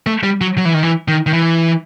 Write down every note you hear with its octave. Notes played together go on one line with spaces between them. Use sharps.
A3
G3
F#3
F#3
E3
D#3
E3
D#3
D#3
E3